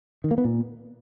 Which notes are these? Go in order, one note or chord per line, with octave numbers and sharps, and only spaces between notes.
D#3
A#3
B3
A#2